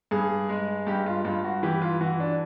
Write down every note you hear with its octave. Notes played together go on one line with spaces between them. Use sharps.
G2 G#4
G#3
G2 G4
F4
G2 F4
F#4
E3 G4
F4
E3 F#4
D4